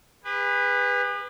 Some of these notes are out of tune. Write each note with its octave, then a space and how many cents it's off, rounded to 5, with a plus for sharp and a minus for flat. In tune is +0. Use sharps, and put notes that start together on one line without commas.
G#4 -45 B4 +0